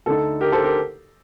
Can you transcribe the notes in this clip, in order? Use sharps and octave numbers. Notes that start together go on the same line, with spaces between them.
D2 D3 A3 D#4 A4
G4 A#4
A4 C5
G4 A#4